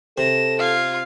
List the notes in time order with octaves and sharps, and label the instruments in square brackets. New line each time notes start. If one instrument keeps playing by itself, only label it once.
[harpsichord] C3 [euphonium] A4 [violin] A#6 E7
[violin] F4 G#6 [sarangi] F5